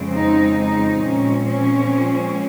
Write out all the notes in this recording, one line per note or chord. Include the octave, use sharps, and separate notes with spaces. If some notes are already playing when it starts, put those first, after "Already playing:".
Already playing: F2 C#3 G#3 C4
D#4
D#4
A#2 F3 G#3 C4 C#4
C#4